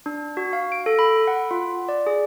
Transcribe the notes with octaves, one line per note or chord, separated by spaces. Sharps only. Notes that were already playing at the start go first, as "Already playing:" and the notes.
D4
F#4
F5
D7
A4
B5
F#5
F4
D5
G#4